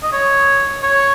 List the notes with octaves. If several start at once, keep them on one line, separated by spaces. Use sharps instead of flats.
D#5
C#5
C#5